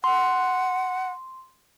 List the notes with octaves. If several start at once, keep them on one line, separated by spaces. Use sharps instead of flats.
F#5 C6